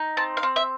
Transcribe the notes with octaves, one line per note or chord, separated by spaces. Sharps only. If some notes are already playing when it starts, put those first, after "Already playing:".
Already playing: D#4
C4 A5
F5
C4
E5